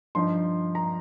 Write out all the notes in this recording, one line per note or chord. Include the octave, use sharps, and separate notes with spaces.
G2 F3 D#4 C6
A#5